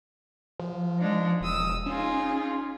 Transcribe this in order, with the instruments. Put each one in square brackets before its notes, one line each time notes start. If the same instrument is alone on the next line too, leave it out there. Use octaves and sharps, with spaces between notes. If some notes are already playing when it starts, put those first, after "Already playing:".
[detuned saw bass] F3
[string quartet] G#3 D4 D#4
[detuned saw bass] E1 [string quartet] D#6 E6
[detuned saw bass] C#4 [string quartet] D#4 F4 G#4